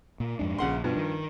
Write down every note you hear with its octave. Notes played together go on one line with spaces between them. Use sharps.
A#2
F2 G#2 D4
E1 A#1 C#3 F#5 C6
G2 B2 F3
D#3